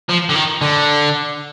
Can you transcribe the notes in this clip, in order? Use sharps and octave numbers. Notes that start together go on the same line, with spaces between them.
F3
D3
D#3
D3